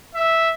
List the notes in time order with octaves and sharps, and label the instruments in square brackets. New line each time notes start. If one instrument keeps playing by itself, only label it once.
[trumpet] E5